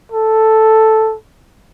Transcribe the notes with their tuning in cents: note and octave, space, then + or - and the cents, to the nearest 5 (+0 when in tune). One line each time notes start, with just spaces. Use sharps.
A4 +0